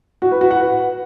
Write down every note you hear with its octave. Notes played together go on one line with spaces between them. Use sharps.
F#4
B4
F#4
F#5
B4